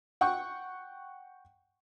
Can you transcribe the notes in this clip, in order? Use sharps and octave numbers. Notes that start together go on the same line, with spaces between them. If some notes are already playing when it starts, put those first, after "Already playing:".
F#5 G5 C#6